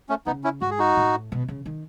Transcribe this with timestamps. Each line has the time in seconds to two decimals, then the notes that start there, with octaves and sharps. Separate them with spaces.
0.09 A3 C#4
0.26 C#3 B3 D#4
0.44 C#4 E4
0.61 G#2 F#4
0.70 G#4
0.79 D#4 F#4
0.97 A2
1.32 B2
1.48 C#3
1.66 D#3